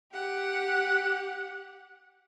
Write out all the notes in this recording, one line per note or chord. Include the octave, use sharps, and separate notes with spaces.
G4 F#5